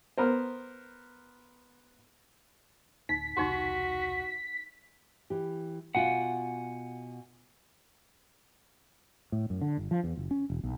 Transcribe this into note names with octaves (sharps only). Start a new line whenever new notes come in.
B3 A#4 C5
D1 D#4 B6
E1 C2 D#4 F#4 G4 C6
E3 G4
B2 F4 F#5 G#5
A2
F#2
D3
G1
F3
E2
F#1
C#4
E1
B1